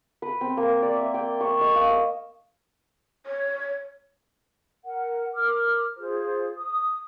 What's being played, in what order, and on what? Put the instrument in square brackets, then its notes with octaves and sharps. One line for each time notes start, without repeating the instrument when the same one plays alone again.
[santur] B4
C4
A#3
D5
E5
G5
C#6
D#5
F5
E6
[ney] C#5
[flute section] A#4 F#5
A#4 D6 F6
F4 G#4 C5
D#6